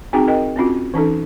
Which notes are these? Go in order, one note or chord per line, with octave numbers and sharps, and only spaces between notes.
C4 D#4 F#4 G#4 G5 A#5
A#4 D#5 G5
C4 C#4 F4 F#4
E3 C#4 D#4 A4